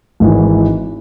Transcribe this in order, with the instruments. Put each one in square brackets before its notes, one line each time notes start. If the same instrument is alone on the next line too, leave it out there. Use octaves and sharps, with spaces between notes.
[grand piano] G#1 G#2 E3